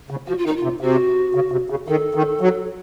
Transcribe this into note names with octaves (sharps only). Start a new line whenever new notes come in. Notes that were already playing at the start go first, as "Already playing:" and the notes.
C#3
F3 F#4
F4
D#3 D#4
F4
C3
C3 F#4
C#3
C3
C#3
D#3 A4
D#3
F#3